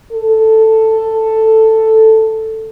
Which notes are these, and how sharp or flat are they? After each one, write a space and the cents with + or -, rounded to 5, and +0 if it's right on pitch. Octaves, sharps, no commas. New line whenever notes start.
A4 +5